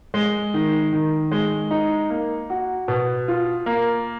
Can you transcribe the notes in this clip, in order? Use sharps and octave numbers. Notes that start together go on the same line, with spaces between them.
G#3
D#3
D#3
G#3
D#4
A#3
F#4
B2
F4
A#3